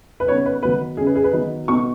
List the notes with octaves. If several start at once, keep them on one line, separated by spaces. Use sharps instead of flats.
B4
C#3 B3 D#4 C#5
B4
D#3 F#3 B3 B4
C#3 G#3 C#4 G#4
B4
G#4
B4
D#3 F#3 B3 D#4
B2 B3 D#4 C#6